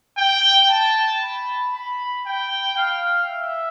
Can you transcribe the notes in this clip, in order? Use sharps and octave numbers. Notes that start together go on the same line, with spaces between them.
G5
A5
B5
B5
G5
F5
E5